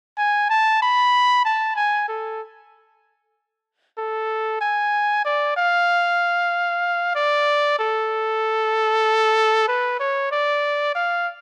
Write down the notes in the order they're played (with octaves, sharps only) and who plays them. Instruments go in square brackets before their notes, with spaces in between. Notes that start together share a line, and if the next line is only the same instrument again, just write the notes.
[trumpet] G#5
A5
B5
A5
G#5
A4
A4
G#5
D5
F5
D5
A4
B4
C#5
D5
F5